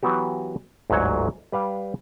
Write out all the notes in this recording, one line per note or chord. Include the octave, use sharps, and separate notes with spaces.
E3 F#3 B3 F#4 G4
G1 D2 G#2 F#3 C#5
G3 B4 F5 G5